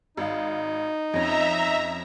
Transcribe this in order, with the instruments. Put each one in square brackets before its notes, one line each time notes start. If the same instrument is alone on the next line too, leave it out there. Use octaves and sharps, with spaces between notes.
[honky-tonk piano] G#1 F5 [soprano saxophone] D#4
[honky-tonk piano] F2 C#4 [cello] D#5 [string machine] E5 A#5